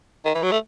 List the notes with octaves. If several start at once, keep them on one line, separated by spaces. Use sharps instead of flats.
D#3
E3
F#3
A3